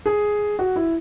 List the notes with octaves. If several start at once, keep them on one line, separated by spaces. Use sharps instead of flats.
G#4
F#4
E4